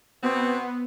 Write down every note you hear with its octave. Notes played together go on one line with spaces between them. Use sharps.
B2 B3 C4